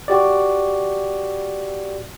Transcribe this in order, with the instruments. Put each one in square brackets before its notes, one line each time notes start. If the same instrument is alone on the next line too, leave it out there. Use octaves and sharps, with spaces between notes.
[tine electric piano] F#4 G4 D5